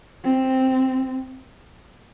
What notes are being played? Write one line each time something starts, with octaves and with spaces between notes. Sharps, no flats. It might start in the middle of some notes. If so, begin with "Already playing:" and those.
C4